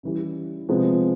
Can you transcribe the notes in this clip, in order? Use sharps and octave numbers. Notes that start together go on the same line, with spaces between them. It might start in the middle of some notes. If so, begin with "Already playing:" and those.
C#3 E3 G3
C3 F3 G#3 B3